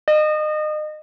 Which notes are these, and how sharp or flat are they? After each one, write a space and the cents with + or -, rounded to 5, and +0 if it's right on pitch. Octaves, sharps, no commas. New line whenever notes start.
D#5 -30